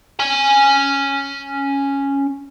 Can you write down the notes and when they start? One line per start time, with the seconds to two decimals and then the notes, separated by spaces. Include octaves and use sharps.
0.20 C#4 G#5